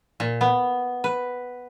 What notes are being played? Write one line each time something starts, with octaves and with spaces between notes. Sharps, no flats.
A#2
B3
B4